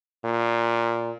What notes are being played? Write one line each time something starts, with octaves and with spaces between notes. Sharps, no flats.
A#2